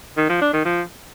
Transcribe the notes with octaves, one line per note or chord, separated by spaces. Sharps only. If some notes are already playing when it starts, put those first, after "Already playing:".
D#3
F3
D4
D#3
F3